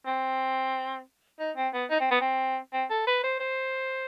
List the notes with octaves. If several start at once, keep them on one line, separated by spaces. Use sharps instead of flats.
C4
D#4
C4
B3
D#4
C4
B3
C4
C4
A4
B4
C5
C5